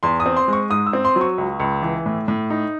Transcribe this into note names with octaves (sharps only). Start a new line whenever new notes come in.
E2 C6
D#6
C4
C6
G#3
C#6
G#2 D#6
E6
C4
C6
F#3
C#6
C#2
C#2
E3
A2
A2
D#4